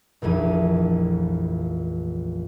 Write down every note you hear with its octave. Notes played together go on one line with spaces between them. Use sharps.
F1 A#1 F2 E3 D#7